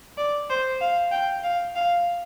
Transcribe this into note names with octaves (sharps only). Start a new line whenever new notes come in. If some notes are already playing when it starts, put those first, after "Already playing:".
D5
C5
F5
G5
F5
F5